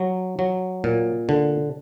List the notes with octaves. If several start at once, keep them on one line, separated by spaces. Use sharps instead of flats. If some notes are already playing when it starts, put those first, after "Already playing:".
Already playing: F#3
F#3
A#2
D3